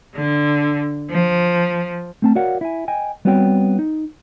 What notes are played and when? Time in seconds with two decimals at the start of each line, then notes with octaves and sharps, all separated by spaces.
0.15 D3
1.10 F3
2.22 A3 C4 A5
2.35 F#4 A#4 C#5 D5 F5 F#5
2.61 E4 G#5
2.88 D#5 G5 G#5
3.25 G3 B3 C4 F#4 C#5 G5
3.79 D#4